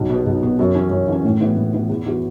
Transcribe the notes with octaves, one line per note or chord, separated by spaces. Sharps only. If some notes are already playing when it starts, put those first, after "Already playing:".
Already playing: B1
B2 B3
B1
B2 B3
F#2
E3 C#4
F#2
E3 C#4
A2
E3 B3
A2
E3 B3
E2
E3 B3 F#4